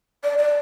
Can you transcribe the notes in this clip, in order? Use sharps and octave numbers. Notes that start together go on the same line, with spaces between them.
D5
D5